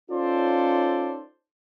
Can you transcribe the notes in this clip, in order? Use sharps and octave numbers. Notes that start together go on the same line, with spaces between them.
C#4 D#4 F4 A4 C5 D5